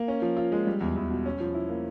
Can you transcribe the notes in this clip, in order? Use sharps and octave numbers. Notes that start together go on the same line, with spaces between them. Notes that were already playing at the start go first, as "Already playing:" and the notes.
Already playing: A#3
C#4
F3
F4
G#3
G3
E2
E2
B2
C#4
F3
E4
A#3